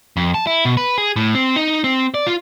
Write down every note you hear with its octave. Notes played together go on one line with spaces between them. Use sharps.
F2
A5
E4
B2
B4
G#4
A2
C4
D#4
C4
D5
F4